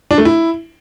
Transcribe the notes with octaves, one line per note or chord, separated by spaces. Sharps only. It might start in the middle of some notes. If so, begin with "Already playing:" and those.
D4
A3
E4